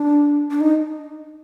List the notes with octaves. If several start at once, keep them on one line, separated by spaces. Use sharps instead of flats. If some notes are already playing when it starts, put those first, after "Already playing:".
Already playing: D4
D4
D#4